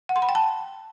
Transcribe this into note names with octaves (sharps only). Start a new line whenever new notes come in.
F#5
C6
B5
G5
A5